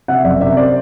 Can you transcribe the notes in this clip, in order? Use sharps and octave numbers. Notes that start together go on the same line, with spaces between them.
C3 E5 F#5
F#1 D5 E5
C3 D5 E5
C5 D5